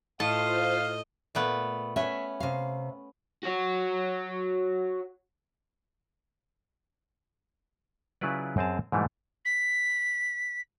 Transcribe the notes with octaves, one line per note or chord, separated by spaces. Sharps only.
A2 F4 C5 D#5 F5 A5
A#2 A3 B3
B3 C#4 E5
C3 F5
F#4 C#5
C#3 F#3 E4 F4 B4 D5
F#2 C4 G#4 A5
G#2 B2 E3 G3 A3
B6